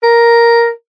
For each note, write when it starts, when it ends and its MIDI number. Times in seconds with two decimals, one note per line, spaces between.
0.03 0.69 70